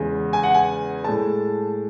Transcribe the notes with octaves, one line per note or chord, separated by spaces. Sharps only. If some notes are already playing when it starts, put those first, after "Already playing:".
Already playing: E2 C#3 G#3
G#5
F#5
G#5
A2 G#3 A5